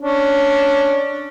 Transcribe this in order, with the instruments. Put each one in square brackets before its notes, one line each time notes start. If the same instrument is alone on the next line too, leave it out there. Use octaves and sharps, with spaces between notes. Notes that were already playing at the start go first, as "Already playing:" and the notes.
[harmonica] C#4 D4